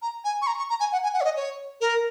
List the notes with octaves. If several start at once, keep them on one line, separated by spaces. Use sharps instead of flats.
A#5
G#5
C#6
A#5
C#6
A#5
G#5
F#5
G#5
F#5
C#5
D#5
C#5
A#4